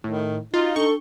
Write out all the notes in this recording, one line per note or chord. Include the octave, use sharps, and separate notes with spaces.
A2 D#3
D#4 F4 F#4 A6 G7
D4 A4 C#6 G7